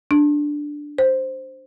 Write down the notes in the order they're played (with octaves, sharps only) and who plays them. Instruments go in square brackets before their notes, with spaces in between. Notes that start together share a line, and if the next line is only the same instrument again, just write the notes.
[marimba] D4
C5